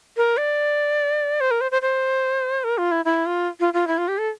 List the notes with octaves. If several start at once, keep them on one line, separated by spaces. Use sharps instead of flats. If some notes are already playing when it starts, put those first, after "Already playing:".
A#4
D5
C5
A#4
C5
C5
C5
A#4
F4
E4
E4
F4
F4
F4
E4
F4
G4
A4